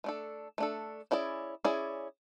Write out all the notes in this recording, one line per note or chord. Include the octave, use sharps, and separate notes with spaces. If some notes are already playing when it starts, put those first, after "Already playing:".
A3 D4 A4
A3 D4 A4
C#4 E4 G#4 D5
C#4 E4 G#4 D5